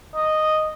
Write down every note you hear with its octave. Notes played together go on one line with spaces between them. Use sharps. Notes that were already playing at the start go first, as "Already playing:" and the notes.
D#5